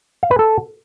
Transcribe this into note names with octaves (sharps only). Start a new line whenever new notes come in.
F5
B4
A4